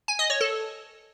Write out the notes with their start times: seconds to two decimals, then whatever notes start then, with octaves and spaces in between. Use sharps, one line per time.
0.08 G#5
0.19 D#5
0.30 C#5
0.41 A4